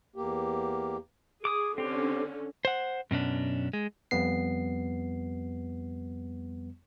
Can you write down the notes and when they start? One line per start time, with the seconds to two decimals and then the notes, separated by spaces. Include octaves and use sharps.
0.16 E2 A#3 G4
1.45 G#4 D6 D#6
1.78 D3 C4 C#4 G4
2.65 C5 F#5
3.11 F#2 B2 C#4 D4
3.73 G#3
4.11 F2 G3 B3 C7